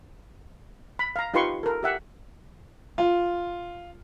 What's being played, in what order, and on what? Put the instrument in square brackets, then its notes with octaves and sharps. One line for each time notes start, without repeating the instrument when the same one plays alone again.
[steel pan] B5
F5 A#5
D#4 F4 G4 B4 C6 C#6
A4 A#4
G4 E5 F#5
[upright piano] F4